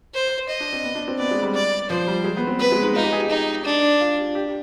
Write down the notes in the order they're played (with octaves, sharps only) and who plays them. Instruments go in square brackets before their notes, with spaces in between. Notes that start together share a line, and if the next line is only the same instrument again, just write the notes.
[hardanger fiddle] C5
D#5
[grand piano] D4
C4
B3
D4
C4
[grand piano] B3 [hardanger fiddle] D5
[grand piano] G#3
G3
[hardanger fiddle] D5
[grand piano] F3 [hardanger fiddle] C5
[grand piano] G3
G#3
B3
C4
[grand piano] B3 [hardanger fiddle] B4
[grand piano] G#3
D#4
[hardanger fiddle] D#4 [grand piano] F4
[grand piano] G4
G#4
G4
[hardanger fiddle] D#4
D4
[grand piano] F4
G4
G4